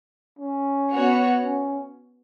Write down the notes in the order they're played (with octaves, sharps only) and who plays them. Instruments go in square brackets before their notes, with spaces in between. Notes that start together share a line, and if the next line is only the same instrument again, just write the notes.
[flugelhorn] C#4
[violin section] B3 F#4 C#5
[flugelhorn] C#4